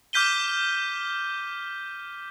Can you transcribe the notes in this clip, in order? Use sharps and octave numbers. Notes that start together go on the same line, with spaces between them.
D6 F6 G6 B6 D#7 G7